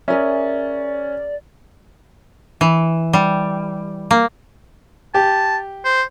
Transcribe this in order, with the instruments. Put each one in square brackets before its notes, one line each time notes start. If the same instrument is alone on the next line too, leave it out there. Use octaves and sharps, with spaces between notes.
[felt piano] C#4 [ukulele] G#4 A#4 E5 [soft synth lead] D5
[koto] E3
G3
A#3
[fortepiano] G4 [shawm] A5
[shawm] C5